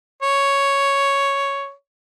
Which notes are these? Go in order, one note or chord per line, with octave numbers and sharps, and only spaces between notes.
C#5